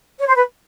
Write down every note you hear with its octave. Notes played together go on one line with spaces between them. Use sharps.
C#5
C5
B4